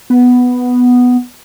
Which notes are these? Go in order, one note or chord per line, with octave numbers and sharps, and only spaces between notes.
B3